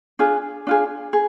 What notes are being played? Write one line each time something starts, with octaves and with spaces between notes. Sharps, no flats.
D4 F4 G#4
D4 F4 G#4
G#4